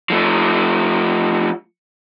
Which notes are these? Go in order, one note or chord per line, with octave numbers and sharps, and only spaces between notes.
F3 A3